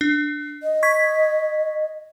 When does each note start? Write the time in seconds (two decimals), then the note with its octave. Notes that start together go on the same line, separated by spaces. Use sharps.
0.01 D4
0.63 D#5
0.83 C#6 G#6 B6